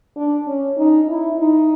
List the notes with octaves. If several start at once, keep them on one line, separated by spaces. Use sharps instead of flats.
D4
C#4
D#4
E4
D#4